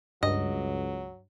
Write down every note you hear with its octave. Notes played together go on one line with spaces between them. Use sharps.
C#2 G2 F#3 D#5